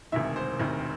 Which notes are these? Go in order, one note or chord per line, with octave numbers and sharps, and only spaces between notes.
E1 D2 C3 D#3 E5
C5
E1 D2 C3 D#3